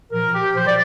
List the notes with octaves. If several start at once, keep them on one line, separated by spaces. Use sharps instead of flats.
A#2 F3 A#4
G4
A#2 F3 C5
D5